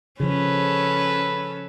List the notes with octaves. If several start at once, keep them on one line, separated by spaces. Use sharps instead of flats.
C#3 F3 C#4 A4 B4